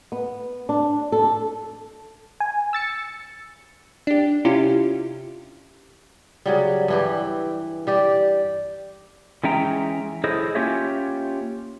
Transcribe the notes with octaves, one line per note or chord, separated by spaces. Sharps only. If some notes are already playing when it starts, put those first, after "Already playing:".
B3
D4
A4
G#5
E6 A6 C#7
D4 G4
C3 C#4 E4 F4 G4
C#3 F#3 G3
G2 E3 G4
G3 G4 D5
E3 G#3 C#4 E5 G5 A#5
E4 G#4 A4 C5 C#5 D#5
A#3 C#4 F4 G4 C#5 E5